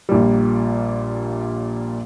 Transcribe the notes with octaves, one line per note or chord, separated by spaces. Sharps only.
A#1 A#2 G3